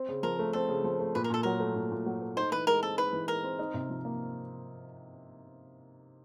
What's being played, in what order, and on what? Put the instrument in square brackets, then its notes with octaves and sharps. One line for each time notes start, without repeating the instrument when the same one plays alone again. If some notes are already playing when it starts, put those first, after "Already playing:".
Already playing: [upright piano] C4
C#3
[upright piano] F3 [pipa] A#4
[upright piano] A3
[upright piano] C4 [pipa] A4
[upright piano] C#3
F3
A3
[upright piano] A#2 [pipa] B4
[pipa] A#4
[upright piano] A#2 [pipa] A4
[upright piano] F#3 [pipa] A#4
[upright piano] A3
A#2
A#2
F#3
A3
[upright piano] D#4 [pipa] C5
[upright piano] E3 [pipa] B4
[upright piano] G#3 [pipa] A#4
[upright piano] C4 [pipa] A4
[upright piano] D#4 [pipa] B4
[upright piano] E3
[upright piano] G#3 [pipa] A#4
[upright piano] C4
D#4
C3
F3
A#3